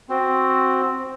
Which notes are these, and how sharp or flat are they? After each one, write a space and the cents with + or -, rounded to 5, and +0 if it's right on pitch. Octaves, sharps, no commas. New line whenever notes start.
C4 +5 F#4 +0